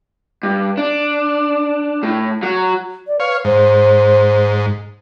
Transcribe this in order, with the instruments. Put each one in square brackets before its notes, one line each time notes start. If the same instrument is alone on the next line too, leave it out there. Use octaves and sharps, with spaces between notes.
[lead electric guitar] G2
D4
A2
F#3
[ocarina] D5
[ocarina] B4 [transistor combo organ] C#5 F5
[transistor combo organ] G#2 [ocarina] C5